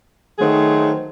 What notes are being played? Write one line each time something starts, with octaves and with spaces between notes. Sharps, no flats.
D#3 F#3 A3 G#4 C5